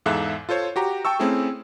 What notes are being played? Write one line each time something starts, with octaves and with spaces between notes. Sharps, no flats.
E2 G#2 A4 E5 F5 F#6
F4 A4 C5 C#5
F#4 G4 A#5
G5 A5 C#6 E6
A3 C4 C#4 E4 G#4